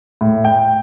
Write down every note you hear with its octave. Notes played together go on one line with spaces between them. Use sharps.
A2
G5